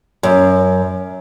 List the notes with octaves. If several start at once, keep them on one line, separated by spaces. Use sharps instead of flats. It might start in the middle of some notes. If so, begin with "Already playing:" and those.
F#2